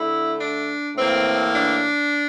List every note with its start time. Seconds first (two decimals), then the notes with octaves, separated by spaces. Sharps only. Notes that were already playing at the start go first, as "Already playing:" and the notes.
Already playing: D3 A3 E4
0.40 D4
0.96 A2 E3 A#3 C4
1.54 D4